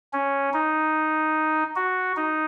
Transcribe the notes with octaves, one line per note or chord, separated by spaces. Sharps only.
C#4
D#4
F#4
D#4